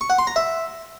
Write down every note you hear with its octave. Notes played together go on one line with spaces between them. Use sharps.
C#6
F#5
C6
A#5
E5